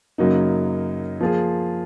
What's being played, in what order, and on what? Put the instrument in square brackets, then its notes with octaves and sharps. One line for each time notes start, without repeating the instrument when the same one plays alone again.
[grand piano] F#2 C#3 F#3 A#3 D#4
F3 A#3 F4 G#4